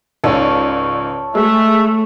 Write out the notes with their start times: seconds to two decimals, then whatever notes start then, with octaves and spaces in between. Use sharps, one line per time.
0.24 C#2 G#2 A4 C#5 D5
1.35 G#3 A3 E5